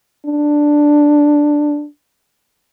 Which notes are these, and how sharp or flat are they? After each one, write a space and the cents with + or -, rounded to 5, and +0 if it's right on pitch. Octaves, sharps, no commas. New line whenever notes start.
D4 +5